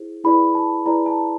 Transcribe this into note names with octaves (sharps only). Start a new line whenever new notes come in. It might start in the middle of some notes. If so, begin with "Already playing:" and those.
Already playing: E4 G#4 C5
E4 G#4 B4 D5 B5
A5
E4 G#4 B4 D5 A#5
A5